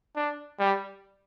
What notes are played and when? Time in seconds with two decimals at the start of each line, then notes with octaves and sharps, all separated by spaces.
0.16 D4
0.59 G3